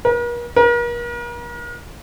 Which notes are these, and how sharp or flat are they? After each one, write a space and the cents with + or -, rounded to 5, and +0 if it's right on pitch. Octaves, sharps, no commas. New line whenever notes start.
A#4 +45
A#4 +40